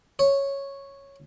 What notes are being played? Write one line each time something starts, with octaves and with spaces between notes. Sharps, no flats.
C#5